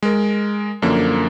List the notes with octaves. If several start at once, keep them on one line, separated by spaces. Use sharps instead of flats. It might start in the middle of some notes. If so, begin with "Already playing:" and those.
G#3 A#4
F#2 D3 F3 A#3